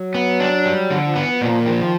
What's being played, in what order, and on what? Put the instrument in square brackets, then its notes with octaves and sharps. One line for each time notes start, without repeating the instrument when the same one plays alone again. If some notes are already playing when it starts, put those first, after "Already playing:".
Already playing: [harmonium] F#3
[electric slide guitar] B3
D4
G3
[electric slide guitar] D3 [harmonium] F3
[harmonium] F3
[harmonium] E3 [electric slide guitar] B3
[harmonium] F3
[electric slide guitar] A#2 [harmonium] F3
[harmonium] D#3
[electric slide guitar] F3
[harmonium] D#3